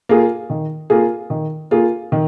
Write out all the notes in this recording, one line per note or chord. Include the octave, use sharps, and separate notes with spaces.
A#3 F4 G#4
D#3
A#3 F4 G#4
D#3
A#3 F4 G#4
D#3